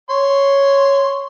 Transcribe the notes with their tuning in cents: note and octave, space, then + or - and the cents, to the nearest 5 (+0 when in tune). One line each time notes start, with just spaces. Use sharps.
C#5 +0 C6 +0